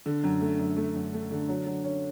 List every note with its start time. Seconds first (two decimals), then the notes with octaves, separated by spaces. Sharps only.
0.06 D3
0.24 F#2
0.41 A3
0.59 F#2
0.77 A3
0.95 F#2
1.13 A3
1.31 D3
1.49 F#3
1.66 F#3
1.84 C#4